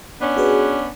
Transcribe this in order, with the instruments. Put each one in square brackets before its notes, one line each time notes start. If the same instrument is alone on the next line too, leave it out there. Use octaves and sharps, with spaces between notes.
[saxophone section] B3 C#4 D4
[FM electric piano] F#4 G#4 B4